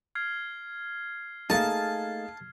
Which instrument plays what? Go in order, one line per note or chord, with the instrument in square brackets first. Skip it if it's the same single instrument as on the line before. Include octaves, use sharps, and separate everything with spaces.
[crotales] F6 G#6 C7
[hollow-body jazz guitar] A3 A#3 D#4 [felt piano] G#4 F5 [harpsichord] A5